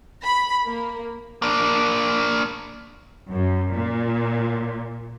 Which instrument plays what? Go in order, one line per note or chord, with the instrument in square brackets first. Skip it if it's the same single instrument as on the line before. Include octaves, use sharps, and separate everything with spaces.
[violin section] B5
A#3
[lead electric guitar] A#3 D4
[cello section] F#2
A#2